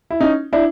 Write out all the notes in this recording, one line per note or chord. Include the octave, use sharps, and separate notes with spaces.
E4
C#4 D#4
D4 E4